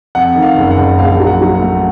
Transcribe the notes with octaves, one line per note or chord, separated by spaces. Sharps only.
F2 F#5
D#3
F5
F#1
F#5
F#1
A#1 F5
F#3
F#5
F#3
F#5
A3